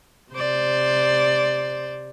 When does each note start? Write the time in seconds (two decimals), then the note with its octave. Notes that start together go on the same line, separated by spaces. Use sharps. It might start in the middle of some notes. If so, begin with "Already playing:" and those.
0.32 C3 C5 D5